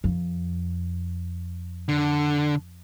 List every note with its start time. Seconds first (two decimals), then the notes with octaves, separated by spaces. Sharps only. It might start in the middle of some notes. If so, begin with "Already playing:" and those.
0.04 F2
1.89 D3